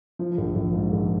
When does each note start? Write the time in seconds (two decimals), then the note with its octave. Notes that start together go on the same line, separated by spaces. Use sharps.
0.19 F3
0.38 A#1
0.55 A#1
0.74 G#2
0.93 A#1